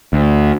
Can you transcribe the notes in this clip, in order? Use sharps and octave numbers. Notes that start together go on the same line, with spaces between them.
D2